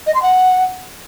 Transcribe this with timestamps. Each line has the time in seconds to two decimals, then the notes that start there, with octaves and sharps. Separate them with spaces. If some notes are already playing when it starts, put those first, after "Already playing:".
0.06 D#5
0.14 C6
0.22 F#5